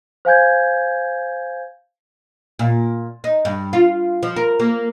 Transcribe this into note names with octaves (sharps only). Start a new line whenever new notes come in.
C5 F5 G#5 G6 G#6
A#2
D#4
G2
F4
F3
A#4
A#3